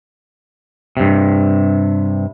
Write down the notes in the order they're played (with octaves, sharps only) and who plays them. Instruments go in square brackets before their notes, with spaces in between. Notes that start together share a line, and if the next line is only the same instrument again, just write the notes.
[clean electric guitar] G2 C3